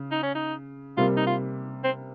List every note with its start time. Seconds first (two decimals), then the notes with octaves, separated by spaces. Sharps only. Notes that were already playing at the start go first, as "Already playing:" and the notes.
Already playing: C#3
0.12 D#4
0.23 C#4
0.35 D#4
0.97 C3 G3 A#3 F4
1.17 D#4
1.27 F4
1.84 C4